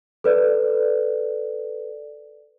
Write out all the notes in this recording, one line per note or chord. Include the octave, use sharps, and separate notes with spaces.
A4 B4 D5